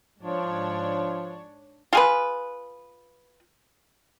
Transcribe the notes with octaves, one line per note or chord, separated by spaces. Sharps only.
G#2 F3 D4 C#5
F4 G#4 B4